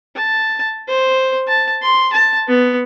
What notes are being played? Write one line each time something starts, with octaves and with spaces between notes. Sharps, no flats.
A5
C5
A5
C6
A5
B3